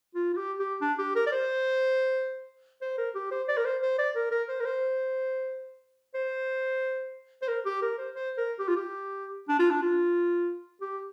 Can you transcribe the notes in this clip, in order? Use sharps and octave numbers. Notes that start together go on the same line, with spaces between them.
F4
F4
G4
G4
D4
G4
A#4
D5
C5
C5
A#4
G4
C5
D5
A#4
C5
C5
D5
A#4
A#4
C5
A#4
C5
C5
C5
A#4
G4
A#4
C5
C5
A#4
G4
F4
G4
D4
F4
D4
F4
G4